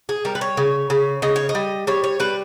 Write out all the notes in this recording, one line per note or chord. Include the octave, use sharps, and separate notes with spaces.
G#4
G3 A#4
B4
C#5
C#3
C#3
C#3 D#5
C#5
D#5
G3
G3 C#5
C#5
G3 B4